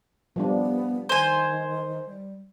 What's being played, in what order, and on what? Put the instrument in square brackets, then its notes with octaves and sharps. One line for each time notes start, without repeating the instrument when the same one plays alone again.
[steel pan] F3 G3 D4 [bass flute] B3
[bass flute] D#3 [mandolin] C5 G#5
[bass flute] G3